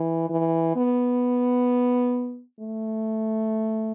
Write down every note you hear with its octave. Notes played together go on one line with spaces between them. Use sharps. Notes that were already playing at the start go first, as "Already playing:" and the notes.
Already playing: E3
E3
B3
A3